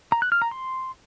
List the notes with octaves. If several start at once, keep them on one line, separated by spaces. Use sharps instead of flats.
A#5
F#6
F6
A#5
C6